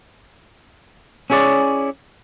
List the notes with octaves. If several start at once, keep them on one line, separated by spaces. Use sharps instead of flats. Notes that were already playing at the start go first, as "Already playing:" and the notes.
C#4 E4 G#4 C#5 D5